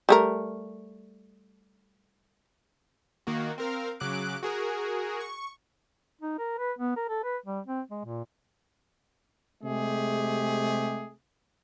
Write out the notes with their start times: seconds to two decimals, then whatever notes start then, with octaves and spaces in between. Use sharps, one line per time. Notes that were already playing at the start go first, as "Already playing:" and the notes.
0.09 G3 A3 A#4
3.27 D#3 A#3 F#4
3.58 C4 A#4 F5
4.00 C#3 F#3 D6 F#6 D7
4.43 F#4 G#4 A#4
5.20 C#6
6.21 D#4
6.38 A#4
6.58 B4
6.79 B3
6.96 A#4
7.09 A4
7.24 B4
7.46 G3
7.66 C4
7.91 G#3
8.05 A#2
9.62 C3 G#3 A3 G4 G#4